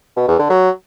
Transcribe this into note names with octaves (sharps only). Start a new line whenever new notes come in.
B2
E2
D3
F#3